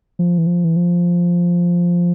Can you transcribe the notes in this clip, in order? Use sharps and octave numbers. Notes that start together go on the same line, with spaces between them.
F3
E3
F3
E3
F3